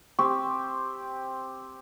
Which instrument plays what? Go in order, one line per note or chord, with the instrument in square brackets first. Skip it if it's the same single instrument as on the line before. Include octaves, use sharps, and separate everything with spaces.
[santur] C4 G4 [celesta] C#6